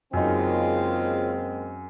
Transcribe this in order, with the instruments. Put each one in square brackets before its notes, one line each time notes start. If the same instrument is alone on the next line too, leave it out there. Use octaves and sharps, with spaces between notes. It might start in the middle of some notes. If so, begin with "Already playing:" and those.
[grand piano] F#2 D#4 [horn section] C#3 F4 [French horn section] G#3 A#3 C4